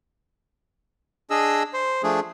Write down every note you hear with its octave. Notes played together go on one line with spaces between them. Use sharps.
D4 G#4 D#5 E6
C5
F3 A3 D4 G#4